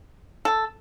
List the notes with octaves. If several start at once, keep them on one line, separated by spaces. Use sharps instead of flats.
A4